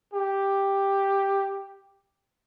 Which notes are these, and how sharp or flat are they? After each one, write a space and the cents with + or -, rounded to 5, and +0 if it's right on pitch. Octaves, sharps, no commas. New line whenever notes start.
G4 +5